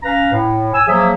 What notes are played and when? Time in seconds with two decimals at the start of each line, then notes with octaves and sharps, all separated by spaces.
0.03 C#4 B4 F5 A#5
0.31 A2
0.73 G#5 E6
0.87 F3 F#3 A#3 G#4 E5